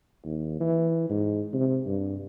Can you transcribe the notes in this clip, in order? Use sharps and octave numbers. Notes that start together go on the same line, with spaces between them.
D#2
E3
G#2
C3
G2